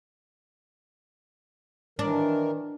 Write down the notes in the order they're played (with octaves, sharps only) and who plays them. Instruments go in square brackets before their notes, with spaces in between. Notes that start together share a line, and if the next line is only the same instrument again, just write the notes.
[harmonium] D#3 E3 A#4 [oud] D4